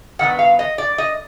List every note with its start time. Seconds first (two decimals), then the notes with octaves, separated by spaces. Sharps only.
0.19 G2 D#3 B3 F#5
0.39 F5
0.59 D#5
0.78 D5
0.98 D#5